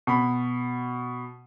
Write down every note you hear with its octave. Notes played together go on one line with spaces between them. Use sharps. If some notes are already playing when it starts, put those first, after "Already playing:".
B2 B5